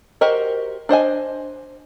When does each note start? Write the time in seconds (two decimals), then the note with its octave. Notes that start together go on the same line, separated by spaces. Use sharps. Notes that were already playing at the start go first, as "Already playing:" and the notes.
0.21 F#4 G4 A#4 C5 D#5
0.89 D4 C5 D#5 G#5